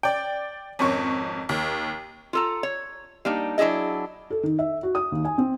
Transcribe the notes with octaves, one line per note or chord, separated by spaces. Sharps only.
D5 G5
G#1 F2 C#4 C#6
D#2
F4 A4 A#5
C#5
G3 A#3 D4 D#4
F#3 D4 E4 G#4 D#5
A4
D#3
E5
F#4
D#6
D#2
G#5
C4